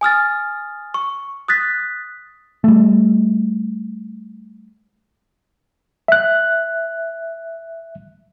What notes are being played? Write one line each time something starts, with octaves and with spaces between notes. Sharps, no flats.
G#5 D#6 F6 A6
C#6
D#6 F#6 A6 B6
G3 A3
E5 F#6